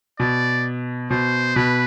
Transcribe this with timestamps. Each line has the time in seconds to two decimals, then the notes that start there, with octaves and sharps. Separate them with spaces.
0.20 B2 D5
1.10 B2 C5
1.56 B2 B4